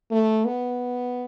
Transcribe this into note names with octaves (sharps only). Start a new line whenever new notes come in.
A3
B3